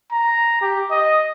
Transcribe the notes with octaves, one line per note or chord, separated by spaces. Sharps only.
A#5
G4
D#5